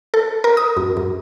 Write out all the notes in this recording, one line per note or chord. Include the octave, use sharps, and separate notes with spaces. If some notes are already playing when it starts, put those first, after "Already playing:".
A4
A#4
D#6
F#2
F#2